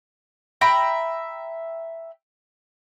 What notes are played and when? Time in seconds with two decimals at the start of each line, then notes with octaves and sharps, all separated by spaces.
0.61 E5 G5 A#5 B5